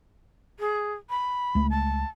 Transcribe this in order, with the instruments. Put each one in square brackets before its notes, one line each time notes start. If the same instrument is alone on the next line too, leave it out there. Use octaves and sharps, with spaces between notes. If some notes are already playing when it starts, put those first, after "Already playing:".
[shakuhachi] G#4
B5
[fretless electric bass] C#2 A3
[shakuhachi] A5